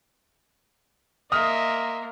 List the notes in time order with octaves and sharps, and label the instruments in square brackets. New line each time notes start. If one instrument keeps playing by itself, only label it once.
[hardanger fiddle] A#3 [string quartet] D#5 E5 C6 [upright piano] D#6 F6